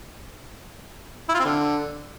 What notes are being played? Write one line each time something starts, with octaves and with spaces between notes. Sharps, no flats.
E4
F4
C4
D3